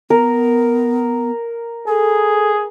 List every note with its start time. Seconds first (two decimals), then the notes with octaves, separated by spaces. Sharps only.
0.10 B3 A#4
1.88 G#4 A4